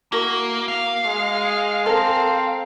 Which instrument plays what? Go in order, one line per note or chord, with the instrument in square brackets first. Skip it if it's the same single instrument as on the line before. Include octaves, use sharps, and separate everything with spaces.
[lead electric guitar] A#3 [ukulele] E4 F#4 A#4
[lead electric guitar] F5
[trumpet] G#3
[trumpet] C4 [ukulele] A4 A#4